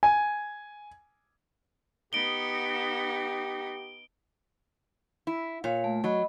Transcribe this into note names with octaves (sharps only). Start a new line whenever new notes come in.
G#5
B3 D#4 G4 D7 G7
E4
A#2 C#5 F5
A3
F#3 D#5 B5